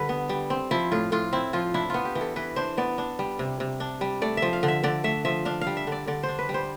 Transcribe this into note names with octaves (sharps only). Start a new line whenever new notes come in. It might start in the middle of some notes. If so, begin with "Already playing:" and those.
Already playing: D3 G3 B4
B3
G3
C4
F3 E4
A2 F4
A2 F4
C4 E4
F3 F4
D4 E4
B3 F4
G4
E3
A4
E3 B4
D4 C5
B3 D5
D4
G3
C3
C3
D4
G3
A3 D5
F3 E5
F5
D3
E5
D3 D5
A3 E5
F3 E5
D4 F5
F5
G3
E5
D3 D5
D3 D5
C5
D4
B4
G3
C5